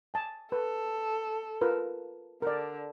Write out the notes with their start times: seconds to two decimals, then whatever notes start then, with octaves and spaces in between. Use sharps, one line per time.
0.14 G#5 A5
0.52 A4 B4
1.61 F4 A#4 B4
2.42 D3 A#4 D5